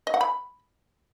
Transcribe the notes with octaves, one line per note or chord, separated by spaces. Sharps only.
D#5
F#5
B5